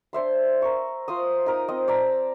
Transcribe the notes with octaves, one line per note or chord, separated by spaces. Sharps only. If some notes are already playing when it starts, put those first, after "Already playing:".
D4 C5 E5 C6
A#4 C#6
F4 C5 C6 D#6
D#4 A#4 D#6
C4 D#5
D5 A5 A#5 E6